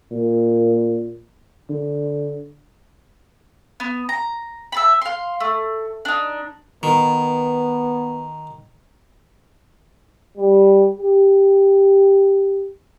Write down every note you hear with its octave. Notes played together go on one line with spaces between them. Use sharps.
A#2
D3
B3
A#5
E5 A5 B5
F5 C6
A3
D4 D#4
D#3 B3
G3
G4